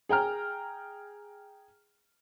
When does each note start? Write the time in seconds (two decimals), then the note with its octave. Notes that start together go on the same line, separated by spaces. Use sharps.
0.09 G#4 G5 A#5 F6